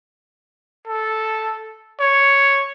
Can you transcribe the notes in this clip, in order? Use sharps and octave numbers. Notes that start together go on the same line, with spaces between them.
A4
C#5